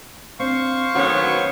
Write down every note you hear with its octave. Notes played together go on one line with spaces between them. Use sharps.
C4 D4 C5 F5 C#6
D2 D#3 F#3 B3 C#4 F#4